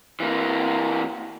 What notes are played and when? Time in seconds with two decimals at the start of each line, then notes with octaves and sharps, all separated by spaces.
0.20 E3 A#3